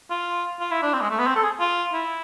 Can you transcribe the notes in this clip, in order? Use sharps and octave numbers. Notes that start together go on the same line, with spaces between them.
F4
F4
E4
D4
C4
G#3
A3
B3
C4
A4
G#4
F4
E4